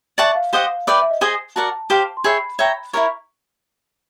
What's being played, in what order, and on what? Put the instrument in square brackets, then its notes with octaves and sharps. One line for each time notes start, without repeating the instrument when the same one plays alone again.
[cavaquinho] D5 F#5 A5 C#6 [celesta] E5
[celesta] F5
[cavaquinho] G4 C5 D#5 F#5 [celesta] F5
[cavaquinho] B4 D5 G5 [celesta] E5
[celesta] E5
D#5
[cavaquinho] G#4 C5 D#5 G#5
[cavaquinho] F#4 A#4 D5 F#5 [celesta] A5
[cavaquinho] G4 C5 F5
[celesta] C6
[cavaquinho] G#4 C#5 E5 G5 [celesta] B5
[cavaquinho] C#5 E5 G5 A#5
[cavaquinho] E4 G4 A#4 C#5 [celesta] C#6